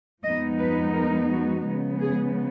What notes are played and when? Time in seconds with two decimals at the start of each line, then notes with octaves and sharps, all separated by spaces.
0.23 F2 F3 G#3 B3 D#4 D#5
0.59 B4
0.94 A#4
1.30 F#4
1.66 C#3 F3 G#3 B3
2.01 G#4